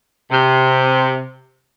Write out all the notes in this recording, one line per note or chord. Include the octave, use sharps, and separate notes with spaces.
C3